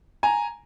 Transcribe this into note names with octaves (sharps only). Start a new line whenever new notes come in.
G#5 A#5